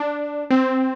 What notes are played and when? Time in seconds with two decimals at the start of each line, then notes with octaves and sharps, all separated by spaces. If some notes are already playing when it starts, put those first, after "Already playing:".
Already playing: D4
0.50 C4